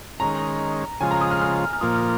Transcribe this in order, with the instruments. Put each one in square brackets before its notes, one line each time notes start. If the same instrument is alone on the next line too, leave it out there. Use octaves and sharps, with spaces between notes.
[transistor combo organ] D#3 G#3 C#4 [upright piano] A#5
[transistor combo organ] C#3 F3 G#3 F4 [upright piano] G#5
[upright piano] A#5
D#6
F6
F6
F6
[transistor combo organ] A#2 F3 A#3 F4 [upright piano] D#6
[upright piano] F6